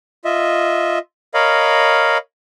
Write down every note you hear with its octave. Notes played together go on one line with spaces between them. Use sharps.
F4 D#5 E5
A#4 C#5 D#5 F5 B5